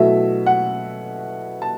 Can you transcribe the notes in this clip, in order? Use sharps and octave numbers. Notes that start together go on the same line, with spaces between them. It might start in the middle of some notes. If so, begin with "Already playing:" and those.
Already playing: B2 F#3 A3 E4 E5
F#5
A5